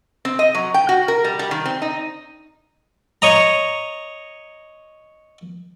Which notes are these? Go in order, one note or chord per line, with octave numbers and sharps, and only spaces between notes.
C4
D#5
F#3
G5
F#4
A#4
G3
G3
D#3
C4
D#4
C#5 D#5 A#5